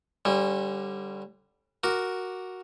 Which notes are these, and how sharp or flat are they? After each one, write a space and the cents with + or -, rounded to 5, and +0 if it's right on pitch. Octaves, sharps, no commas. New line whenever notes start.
D3 +0 G3 +0 C#4 -35
F#4 +0 A#4 +0 D6 +0